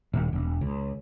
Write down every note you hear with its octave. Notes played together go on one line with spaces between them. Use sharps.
D#1
E1
C#2